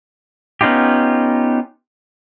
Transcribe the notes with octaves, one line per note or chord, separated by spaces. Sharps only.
B3 C#4 D#4 F4 G4